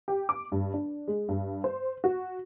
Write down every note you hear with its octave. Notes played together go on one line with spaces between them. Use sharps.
G4
D6
G2
D4
G#3
G2
C5
F#4